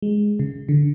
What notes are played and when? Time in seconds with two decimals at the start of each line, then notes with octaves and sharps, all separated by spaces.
0.02 G#3
0.39 C#3
0.69 D3